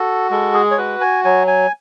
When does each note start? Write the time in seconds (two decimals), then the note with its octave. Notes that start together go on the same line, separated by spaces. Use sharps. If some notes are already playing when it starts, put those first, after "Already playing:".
Already playing: F#4 A4
0.31 G#3 A4
0.54 G#4
0.71 C#5
0.78 F#4 B4
1.01 G#5
1.24 F#3 G#5
1.47 G#5